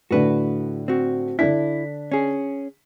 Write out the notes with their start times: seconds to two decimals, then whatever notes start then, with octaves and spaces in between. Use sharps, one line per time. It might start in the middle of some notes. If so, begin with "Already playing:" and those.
0.11 A2 D3 F#4 B4
0.88 C4 F#4
1.39 D3 D4 E4 B6
2.12 C#4 G#4